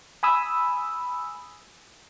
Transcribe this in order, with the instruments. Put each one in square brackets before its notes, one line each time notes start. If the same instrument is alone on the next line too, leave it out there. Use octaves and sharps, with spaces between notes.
[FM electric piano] G#5 B5 D#6 E6